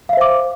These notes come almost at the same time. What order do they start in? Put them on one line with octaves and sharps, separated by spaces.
F5 E5 C5 D6